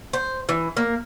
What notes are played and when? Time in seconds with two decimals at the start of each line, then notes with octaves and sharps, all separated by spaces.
0.13 C5
0.49 E3
0.77 A#3